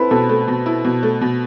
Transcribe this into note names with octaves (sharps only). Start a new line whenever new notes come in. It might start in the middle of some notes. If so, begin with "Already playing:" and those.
Already playing: C4 E4 A4 B4
B2 A4
A3
B2
E4
B2
A3
B2